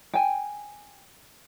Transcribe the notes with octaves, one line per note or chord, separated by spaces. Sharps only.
G5 G#5